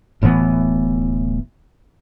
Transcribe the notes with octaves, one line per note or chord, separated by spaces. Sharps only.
D1 A2 E3 B3